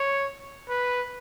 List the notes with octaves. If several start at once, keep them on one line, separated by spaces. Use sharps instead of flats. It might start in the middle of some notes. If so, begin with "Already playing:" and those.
Already playing: C#5
B4